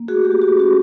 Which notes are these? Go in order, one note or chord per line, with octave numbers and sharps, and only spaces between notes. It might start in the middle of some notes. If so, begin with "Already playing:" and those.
Already playing: A#3
A3 F#4 G#4
G4
F#4
F#4
C#4
F#4